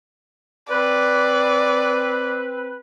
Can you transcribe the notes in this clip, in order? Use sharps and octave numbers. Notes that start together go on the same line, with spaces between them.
C4 B4 D5